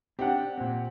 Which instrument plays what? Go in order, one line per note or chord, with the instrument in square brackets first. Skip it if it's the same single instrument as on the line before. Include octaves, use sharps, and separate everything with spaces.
[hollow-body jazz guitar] C4 D4 [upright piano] G4 F#5
[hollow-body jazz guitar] A#2 C4